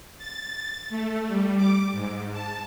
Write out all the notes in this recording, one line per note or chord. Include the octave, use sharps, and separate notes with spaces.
A6
A3
G3
D6
G#2
A5